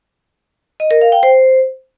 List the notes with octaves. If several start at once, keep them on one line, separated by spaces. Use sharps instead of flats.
D#5
A#4
F5
G5
C5